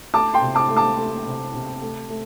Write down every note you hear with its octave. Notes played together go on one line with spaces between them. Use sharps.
A3 A5 D6
G5 C6
C3
A5 D6
A3
A5 D6
A3
C3
C3
A3
A3